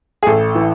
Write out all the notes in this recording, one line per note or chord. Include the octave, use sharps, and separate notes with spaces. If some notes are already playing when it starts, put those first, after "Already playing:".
G#4
A1 A4
E3